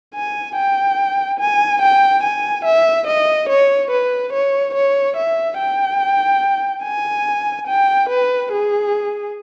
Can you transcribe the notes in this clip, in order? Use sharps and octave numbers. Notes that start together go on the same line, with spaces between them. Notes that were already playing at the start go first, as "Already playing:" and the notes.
G#5
G5
G#5
G5
G#5
E5
D#5
C#5
B4
C#5
C#5
E5
G5
G#5
G5
B4
G#4